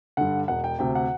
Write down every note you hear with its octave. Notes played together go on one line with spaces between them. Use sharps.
G2 D3 F#5
E1 F#5
G5
D2 C3 G5
F#5